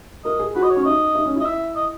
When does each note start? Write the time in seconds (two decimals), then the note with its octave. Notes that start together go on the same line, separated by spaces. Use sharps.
0.24 A#4 D#5
0.39 G#4
0.55 F#4 B4
0.63 D#5
0.70 C#5
0.76 C#4
0.85 D#4 D#5
1.15 D#4
1.26 C#4
1.36 E4 D#5
1.46 E5
1.76 D#5